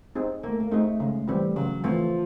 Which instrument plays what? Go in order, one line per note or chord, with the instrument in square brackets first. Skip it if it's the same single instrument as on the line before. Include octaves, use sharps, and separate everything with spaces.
[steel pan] C4 D#4 G#4
[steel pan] A3 [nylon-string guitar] A#3
[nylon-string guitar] A#3
[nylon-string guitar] A3 [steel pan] C4 D#4 G#4
[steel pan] C#3 [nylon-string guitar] G#3
[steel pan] E3 A3 C4 [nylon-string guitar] G3
[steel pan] C#3 [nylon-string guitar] F#3
[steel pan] E3 A3 C4 [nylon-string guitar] F3